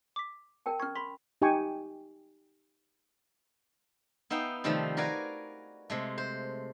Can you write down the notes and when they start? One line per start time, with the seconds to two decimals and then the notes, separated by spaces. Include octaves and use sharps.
0.16 D6 B6
0.66 A#4 G5 A5
0.80 C#4 C#6 F6 G#6
0.95 B5 C6 B6 F#7
1.42 D#4 G4 G5 G#5 C#6
4.30 B3 D#4 E5 F5 G5
4.64 C3 D#3 F3 G3 A3
4.97 F#4 A#4 B4 D5 F5 G#5
5.90 C3 G#3 A3
6.18 C5